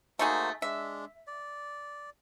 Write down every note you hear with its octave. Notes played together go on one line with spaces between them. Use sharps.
A3 A#3 D#4 F#4 G#4 C5
G#3 D4 E5
D5